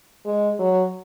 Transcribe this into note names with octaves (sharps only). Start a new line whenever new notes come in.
G#3
F#3